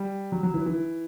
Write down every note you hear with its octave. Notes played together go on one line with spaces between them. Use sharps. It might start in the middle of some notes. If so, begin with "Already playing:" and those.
Already playing: G3
F#3
F#3
E3
E3